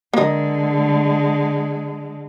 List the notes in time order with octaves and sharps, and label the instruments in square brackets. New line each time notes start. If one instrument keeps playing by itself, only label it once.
[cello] D3 G#3 [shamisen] A#3 D#5